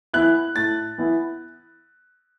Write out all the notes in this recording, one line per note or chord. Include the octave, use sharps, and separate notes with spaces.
E3 B3 E4 F#6
A2 A6
E3 B3 E4